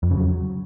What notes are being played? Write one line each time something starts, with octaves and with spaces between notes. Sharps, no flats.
F2
C#3
F#3